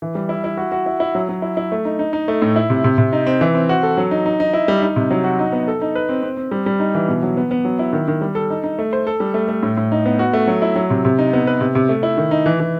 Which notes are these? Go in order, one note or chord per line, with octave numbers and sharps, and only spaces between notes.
E3
G3
E4
E4
F#4
F#4
E4
E4
F#3
F#3
E4
E4
A3
D#4
D#4
D#4
A3
A2
E4
C3
C3
C3
D#4
C4
E3
C4
F#4
A4
F#3
D#4
D#4
D#4
E4
G3
D#4
C3
F#3
F#4
D#4
B3
A4
D#4
B4
C4
C4
C4
G3
G3
D#4
E3
B2
F#3
B3
B3
F#3
E4
D#3
D#3
G3
A4
D#4
D#4
A3
C5
A4
G3
A3
A3
A2
A2
D#4
B3
F#4
A3
F#3
E4
F#3
C3
C3
D#4
B3
B4
C3
C3
A3
E4
D#3
D#4
E3
E3